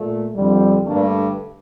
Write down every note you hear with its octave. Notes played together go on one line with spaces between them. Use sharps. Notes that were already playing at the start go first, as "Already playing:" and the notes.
Already playing: A#2 A3
F2 D3 G3
G2 D3 A3 A#3 D4